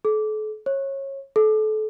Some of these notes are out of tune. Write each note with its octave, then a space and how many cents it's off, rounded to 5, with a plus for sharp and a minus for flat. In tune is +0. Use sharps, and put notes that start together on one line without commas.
A4 -40
C#5 -25
A4 -30